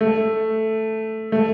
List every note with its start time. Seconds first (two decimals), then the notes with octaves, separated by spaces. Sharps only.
0.01 A3
1.32 A3